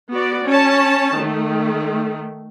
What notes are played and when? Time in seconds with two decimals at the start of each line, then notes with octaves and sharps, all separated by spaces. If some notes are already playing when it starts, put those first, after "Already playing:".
0.12 B3 F#4 D5
0.47 C#4 C#5 A5
1.18 D#3 A3